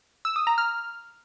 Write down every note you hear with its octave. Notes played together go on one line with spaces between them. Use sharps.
E6
D#6
A#5
F6